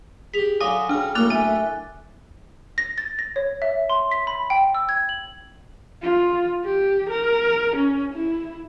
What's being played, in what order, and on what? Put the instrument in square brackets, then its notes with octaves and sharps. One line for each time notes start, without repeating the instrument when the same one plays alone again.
[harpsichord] G4 G#4 [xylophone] B6 F7
[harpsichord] D3 F#3 [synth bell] F5 D6 D#6 [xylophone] G#5
[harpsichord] B1 C#3 [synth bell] D4 F6
[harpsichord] B1 F#2 A2 [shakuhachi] A#3 [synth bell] D6 F#6 A6 [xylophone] F7
[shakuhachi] E5 [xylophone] G#5
[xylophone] A#6
A6
A#6
C#5
E5
C6
B6
B5
G5
E6
G#6
F#7
[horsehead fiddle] F4
G4
A#4
C#4
E4